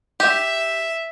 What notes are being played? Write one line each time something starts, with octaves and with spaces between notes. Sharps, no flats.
G4 E5